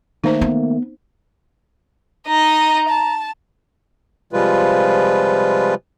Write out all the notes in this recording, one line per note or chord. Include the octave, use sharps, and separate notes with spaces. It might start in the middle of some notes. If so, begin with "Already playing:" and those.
D#3 A3 A#3 D#4 C5
B3
D#4 D#5 A#5
A5
C3 F3 G3 G#3 F4 B4